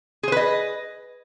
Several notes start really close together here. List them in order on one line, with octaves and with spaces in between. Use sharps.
G#4 C5 B4 D#5